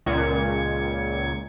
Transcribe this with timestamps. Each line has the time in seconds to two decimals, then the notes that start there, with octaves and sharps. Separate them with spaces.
0.06 C#2 A#2 G#6 C#7